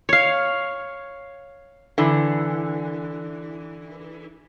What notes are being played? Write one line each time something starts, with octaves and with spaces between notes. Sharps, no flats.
C#5 F5
D3 E3